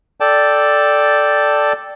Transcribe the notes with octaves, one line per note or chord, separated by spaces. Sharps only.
A4 D5 G5 A5